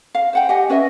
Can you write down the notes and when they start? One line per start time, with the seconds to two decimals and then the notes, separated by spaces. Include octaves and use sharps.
0.15 F5
0.33 C5 F#5 G5
0.49 G4 D#5 F#5 G#5
0.70 C#4 B4 D#5 E5